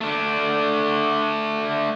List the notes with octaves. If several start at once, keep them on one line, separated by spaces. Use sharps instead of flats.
A3 D4